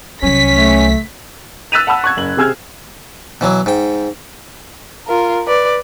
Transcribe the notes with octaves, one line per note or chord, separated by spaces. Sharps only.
C2 F#3 C#4 B6
A3
E6 F#6 A6 B6 D#7 F7
F#5 A5 B5 E6
C#6 F#6 G#6
F#1 F#7
C3 C4 G#4 E6 F6 G#6
B2 E3 F#3
G#2 G5
F4 A#4
B4 D5